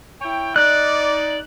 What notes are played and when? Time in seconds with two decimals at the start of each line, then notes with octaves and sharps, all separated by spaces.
0.22 E4 C#5 G5
0.56 D#4 D5 F#6